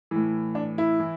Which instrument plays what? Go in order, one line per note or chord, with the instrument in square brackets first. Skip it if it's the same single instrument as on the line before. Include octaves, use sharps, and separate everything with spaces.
[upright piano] A2 E3
D4
E4
E3